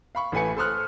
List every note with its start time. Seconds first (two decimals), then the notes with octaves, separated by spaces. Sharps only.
0.15 F5 B5 C#6
0.32 A1 A3 B4 G#5 C#7
0.57 A4 C5 C6 D#6 F6 F#6